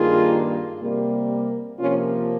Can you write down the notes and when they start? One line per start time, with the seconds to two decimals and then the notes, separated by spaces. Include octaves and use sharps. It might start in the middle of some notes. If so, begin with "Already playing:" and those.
Already playing: G2 D#3 A#3 F4 G#4
0.81 C3 G3 A#3
1.79 C3 F3 A#3 C#4 F4